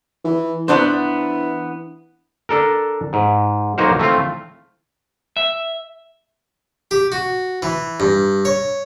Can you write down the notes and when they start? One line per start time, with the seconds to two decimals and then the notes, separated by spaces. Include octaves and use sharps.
0.25 E3
0.68 E3 B3 D4 C5
2.49 D4 A4 A#4
3.13 G#2
3.78 B1 A#3 D#4 F#4 C5 F5
3.99 A3 C4 F4 F5
5.37 E5
6.91 G4
7.12 F#4
7.62 E3
8.00 G2
8.45 C#5